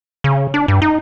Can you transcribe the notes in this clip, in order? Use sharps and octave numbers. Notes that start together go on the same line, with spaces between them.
C#3
D4
G2
D#4